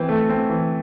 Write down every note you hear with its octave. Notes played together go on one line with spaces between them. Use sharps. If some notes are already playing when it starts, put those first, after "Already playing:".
Already playing: E3 C4 C5
A3
C4
E3